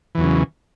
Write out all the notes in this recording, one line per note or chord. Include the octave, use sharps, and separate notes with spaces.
E2 C#3 E3 F#3